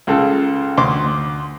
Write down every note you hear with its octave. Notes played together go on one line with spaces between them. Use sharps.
C#2 C#3 A4
D2 C6 D6